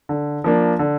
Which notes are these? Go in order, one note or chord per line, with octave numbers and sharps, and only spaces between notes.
D3
F3 A#3 D4
D3